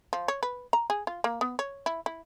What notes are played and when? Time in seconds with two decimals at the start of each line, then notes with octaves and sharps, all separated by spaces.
0.13 F3
0.28 C#5
0.43 B4
0.73 A#5
0.90 G#4
1.07 F4
1.24 A#3
1.41 B3
1.59 C#5
1.86 E4
2.06 E4